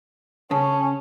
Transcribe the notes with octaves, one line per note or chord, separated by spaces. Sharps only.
C#3 C#4 A5